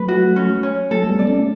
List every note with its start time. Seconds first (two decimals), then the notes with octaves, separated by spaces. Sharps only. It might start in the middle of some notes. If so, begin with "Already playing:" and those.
Already playing: F#3 A3 B4
0.08 F#4
0.36 C#4
0.63 C#4
0.91 F#3 A3 A4
1.09 G3 B3
1.19 D5
1.27 A3 C#4